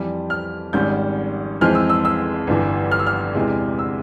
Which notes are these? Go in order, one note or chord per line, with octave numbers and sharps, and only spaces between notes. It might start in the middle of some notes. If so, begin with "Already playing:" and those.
Already playing: F2 E3 G3
F6
G#1 G#2 G3 C#4 G6
F2 E3 G#3 C4 F6
E6
E6
E6
G1 G2 E3
F6
E6
F6
E2 C3 E3 G#3
E6